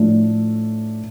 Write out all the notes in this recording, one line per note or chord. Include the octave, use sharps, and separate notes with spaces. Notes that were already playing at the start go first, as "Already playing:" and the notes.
Already playing: A2 F3 A3 D4